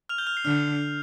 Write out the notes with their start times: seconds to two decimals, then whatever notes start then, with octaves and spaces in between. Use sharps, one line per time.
0.09 F6 F7
0.18 G6 G7
0.27 F6 F7
0.37 C7
0.45 D3 F6